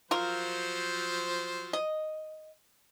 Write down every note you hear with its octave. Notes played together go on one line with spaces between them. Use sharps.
F3 F#3 F4 A#4 C5
D#5